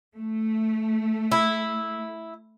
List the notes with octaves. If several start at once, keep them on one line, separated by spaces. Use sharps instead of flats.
A3
E4